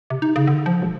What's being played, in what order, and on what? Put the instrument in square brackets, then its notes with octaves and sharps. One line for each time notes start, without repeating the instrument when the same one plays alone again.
[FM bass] C3
D#4
C#3
D3
F3
E1